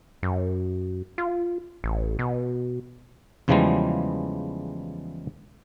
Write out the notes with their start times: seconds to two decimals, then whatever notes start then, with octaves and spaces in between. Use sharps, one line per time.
0.23 F#2
1.18 F4
1.84 A1
2.19 B2
3.48 E2 C#3 E3 F3 G3 G#3